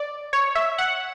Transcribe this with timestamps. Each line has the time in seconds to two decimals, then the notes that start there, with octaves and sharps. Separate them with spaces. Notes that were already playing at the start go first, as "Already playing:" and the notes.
Already playing: D5
0.33 C#5
0.55 E5
0.78 F#5